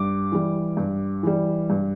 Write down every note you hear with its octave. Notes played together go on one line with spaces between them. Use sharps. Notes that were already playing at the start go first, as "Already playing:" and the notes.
Already playing: G2 D6
E3 G3
G2
E3 G3
G2